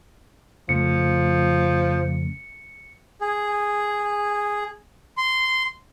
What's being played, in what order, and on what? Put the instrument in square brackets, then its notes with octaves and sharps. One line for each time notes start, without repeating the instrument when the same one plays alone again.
[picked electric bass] F2 C#3 A3 [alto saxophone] F3 [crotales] C#7
[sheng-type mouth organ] G#4
C6